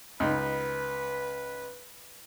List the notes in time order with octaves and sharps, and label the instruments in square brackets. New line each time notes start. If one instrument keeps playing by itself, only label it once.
[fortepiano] C#2 D#4 [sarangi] B4